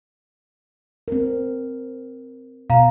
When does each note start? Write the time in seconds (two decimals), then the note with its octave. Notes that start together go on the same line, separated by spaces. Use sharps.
1.08 C4 A#4
2.70 B2 F5 A#5